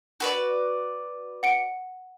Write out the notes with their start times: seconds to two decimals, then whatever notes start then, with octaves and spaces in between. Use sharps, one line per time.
0.20 F#4 B4 D5
1.43 F#5 C#7 D7